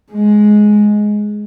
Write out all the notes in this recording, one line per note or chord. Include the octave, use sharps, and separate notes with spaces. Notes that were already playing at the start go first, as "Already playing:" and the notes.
G#3